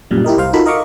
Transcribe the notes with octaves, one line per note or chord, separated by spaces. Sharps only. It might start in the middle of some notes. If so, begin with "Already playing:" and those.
F#2 A#2 G3
E4 G4 A#4 D#5
C2 C5 F5
D#4 F4 F#4 A4 A#4 B5
A#4 D#5 F5 C#6 D6